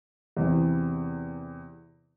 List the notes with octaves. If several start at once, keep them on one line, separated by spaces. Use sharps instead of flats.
E2 C3 E3